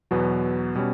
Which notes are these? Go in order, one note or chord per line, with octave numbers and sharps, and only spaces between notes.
E2 B2 F#3 B3 F#4
B2 G3 C#4